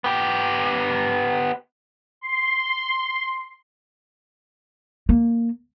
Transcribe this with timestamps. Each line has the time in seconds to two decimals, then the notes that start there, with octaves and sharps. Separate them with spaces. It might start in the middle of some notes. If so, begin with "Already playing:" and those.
0.04 B3 G4
2.21 C6
5.09 A#3